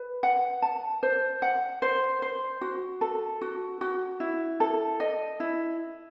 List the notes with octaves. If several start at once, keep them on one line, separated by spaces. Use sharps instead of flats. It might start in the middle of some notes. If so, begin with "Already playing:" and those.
Already playing: B4
F#5
A5
C5
F#5
C5
C5
F#4
A4
F#4
F#4
E4
A4
D#5
E4